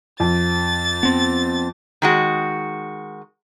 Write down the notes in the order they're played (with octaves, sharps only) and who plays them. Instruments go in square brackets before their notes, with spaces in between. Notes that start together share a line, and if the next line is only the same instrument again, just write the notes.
[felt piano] F2 [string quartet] A6
[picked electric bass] B3 C4
[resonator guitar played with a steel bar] D#3 G#3 F#4